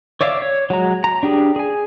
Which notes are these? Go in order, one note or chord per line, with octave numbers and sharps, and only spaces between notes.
C#5 D5 E5 F5 D6
C#5
F#3 G#3 A#5
A#5
D4 G4 G#4
G#4 G#5